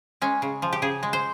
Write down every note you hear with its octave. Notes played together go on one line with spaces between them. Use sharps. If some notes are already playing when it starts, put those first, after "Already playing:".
G#3 C#4
C#3
F3
G4
C#3 G#4
G#3
C5